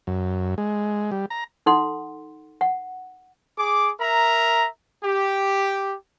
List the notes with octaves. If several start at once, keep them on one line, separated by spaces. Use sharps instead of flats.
F#2
G#3
G3
A#5
D#4 A4 F#5 C6
F#5
G#4 D6
A#4 E5 A#5
G4